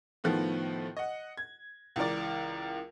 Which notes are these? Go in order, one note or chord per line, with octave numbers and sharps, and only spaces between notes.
A2 D#3 F3 B3
D#5 F#5
G#6
C#2 E3 A#4 D5